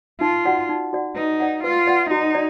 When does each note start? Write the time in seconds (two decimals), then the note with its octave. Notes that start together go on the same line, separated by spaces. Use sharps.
0.21 D#4 F4
0.45 F#4 D5 F#5
0.69 D#4
0.93 F#4 D5 F#5
1.16 D#4 B4
1.40 D5 F#5
1.64 F4 B4
1.87 D5 F#5
2.11 D#4 F#4
2.35 D5